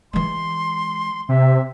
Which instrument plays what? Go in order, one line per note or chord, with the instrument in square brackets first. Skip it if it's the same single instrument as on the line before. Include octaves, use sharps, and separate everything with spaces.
[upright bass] E3 G#3 [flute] C6
[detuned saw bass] C3 [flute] E5